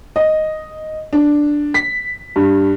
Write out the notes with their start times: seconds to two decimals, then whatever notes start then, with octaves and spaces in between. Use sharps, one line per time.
0.16 D#5
1.13 D4
1.74 B6
2.36 G2